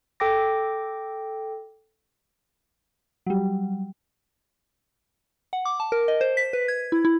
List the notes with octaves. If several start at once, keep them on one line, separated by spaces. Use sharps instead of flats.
A4 G5 D6 A#6
F#3 G3
F#5
D6
A5
A#4
D#5
C5
B6
B4
G#6
E4
E4